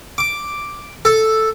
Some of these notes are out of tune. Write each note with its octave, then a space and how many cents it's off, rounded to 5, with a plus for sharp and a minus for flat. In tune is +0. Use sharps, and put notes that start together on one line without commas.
D6 +0
A4 +0